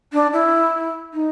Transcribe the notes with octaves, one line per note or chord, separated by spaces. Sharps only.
D4
E4
D#4